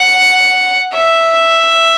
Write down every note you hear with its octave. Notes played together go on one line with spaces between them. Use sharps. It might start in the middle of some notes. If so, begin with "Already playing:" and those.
Already playing: F#5
E5